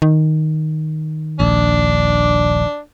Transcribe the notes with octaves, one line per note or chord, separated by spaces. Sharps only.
D#3
D#1 A#1 D4